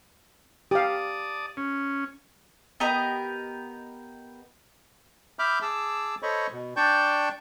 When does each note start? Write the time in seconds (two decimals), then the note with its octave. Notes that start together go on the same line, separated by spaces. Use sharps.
0.71 G4 D5 F5 A5 D#6
1.57 C#4
2.80 B3 G4 A#4 D#5
5.39 E5 B5 D6 F6 G6
5.62 G#4 A5 D6 E6
6.23 A4 C5 C#5 D#5 B5 C#6
6.52 B2
6.77 D4 D5 G5 A5 C#6 G6